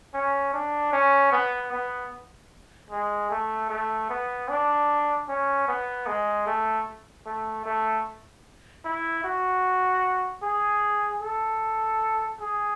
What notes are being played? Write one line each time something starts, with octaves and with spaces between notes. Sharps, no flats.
C#4
D4
C#4
B3
B3
G#3
A3
A3
B3
D4
C#4
B3
G#3
A3
A3
A3
E4
F#4
G#4
A4
G#4